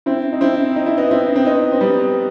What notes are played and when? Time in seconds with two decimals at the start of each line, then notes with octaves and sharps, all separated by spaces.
0.06 C4 E4
0.33 D#4
0.41 C4 E4
0.76 D#4
0.86 E4
0.98 B3 D#4
1.11 C4 E4
1.36 C4
1.45 B3 D#4
1.72 C4
1.81 G3 B3